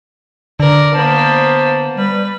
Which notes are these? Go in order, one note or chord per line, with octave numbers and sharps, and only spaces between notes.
D3 A#4 D5
A#3 B3 C5 A5
G3 B4